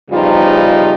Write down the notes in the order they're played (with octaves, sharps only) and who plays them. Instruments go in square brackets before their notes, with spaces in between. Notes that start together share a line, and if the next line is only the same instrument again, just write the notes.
[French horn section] E2 C#3 F3 G3 D#4 F4